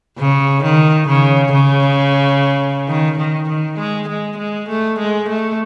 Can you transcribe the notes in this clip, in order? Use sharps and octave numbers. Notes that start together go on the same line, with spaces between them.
C#3
D#3
C#3
C#3
D#3
D#3
D#3
G#3
G#3
G#3
A3
G#3
A3